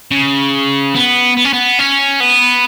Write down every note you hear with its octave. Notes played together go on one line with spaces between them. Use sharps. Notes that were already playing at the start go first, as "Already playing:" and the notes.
C#3
B3
B3
C#4
B3
C#4
B3